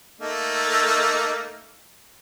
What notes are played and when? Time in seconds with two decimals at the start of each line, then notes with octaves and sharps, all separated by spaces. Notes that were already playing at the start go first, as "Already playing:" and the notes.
0.19 A3 A#3 D#4